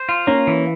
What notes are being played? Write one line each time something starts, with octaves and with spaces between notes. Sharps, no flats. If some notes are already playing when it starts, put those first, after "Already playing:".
Already playing: C5
F4
A#3 C#4
E3